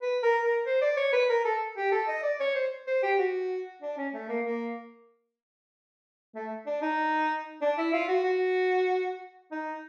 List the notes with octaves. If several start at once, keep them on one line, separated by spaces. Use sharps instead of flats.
B4
A#4
A#4
C5
D5
C#5
B4
A#4
A4
G4
A4
D#5
D5
C#5
C5
C5
G4
F#4
D4
C#4
A3
A#3
A#3
A3
D4
D#4
D4
E4
F4
F#4
F#4
D#4